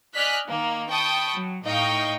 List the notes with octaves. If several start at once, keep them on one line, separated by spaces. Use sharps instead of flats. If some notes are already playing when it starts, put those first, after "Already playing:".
D5 D#5 G#5 F6 F#6 B6
D#3 A#3
G5 A5 B5 C#6 D#6
F#3
A2 D#4 D#5 F5 G5 C#6